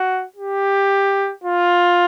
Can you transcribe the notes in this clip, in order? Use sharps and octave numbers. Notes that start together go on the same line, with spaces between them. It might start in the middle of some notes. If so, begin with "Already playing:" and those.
Already playing: F#4
G4
F4